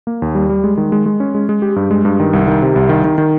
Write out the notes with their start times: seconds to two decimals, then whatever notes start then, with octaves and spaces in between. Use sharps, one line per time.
0.07 A#3
0.22 D#2
0.35 G3
0.49 G3
0.64 G#3
0.77 D#3
0.92 G#3
1.06 G#3
1.20 C#4
1.34 G#3
1.49 G#3
1.62 G4
1.76 G2
1.91 G#3
2.05 G2
2.20 D#3
2.33 C2
2.48 D#3
2.62 C3
2.76 C2
2.89 D#3
3.04 D#3
3.18 D#3